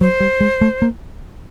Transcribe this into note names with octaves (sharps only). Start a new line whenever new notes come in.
F#3 C5
G3
G#3
A3
A#3